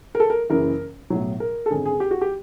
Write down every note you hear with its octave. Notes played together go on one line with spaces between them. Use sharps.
A#4
A4
A#4
F#1 F#2 C#3 E3 A#4
B1 A2 F#3
A#4
A4
G#1 F#2 D3 G#4
G#4
G4
F#4
G4